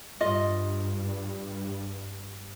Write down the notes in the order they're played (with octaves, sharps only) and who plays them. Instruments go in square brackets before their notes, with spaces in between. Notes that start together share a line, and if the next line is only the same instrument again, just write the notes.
[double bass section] G2 [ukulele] F4 D#5